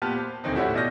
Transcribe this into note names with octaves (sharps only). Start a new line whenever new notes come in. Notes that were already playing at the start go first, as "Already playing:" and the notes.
A#2 B3 G4 A5 F6
C5
E1 D2 D#3 C4 D#4
A2 C#4 E4 F#4 G4
B2 D5 D#5 F6 G6 A#6